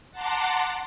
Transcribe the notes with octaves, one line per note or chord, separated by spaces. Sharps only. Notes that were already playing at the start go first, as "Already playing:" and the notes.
F#5 A5 A#5 C6 D6